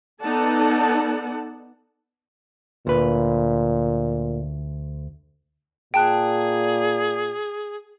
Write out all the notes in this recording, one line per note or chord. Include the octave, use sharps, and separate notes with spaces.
B3 D#4 A4 D5 F#5 A5
D2 A#2 B4
A#2 G#4 G5 A5 F#6